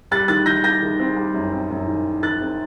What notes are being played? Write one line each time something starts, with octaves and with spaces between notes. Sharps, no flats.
G3 F#6 A6
D#3 F#6 A6
D#3 G6 A#6
G3 G6 A#6
D#3
C4
G3
F#2
C4
F#2
D#3
D#3
D#3 F#6 A6
C4